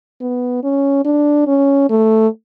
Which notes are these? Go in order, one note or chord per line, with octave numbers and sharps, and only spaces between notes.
B3
C#4
D4
C#4
A3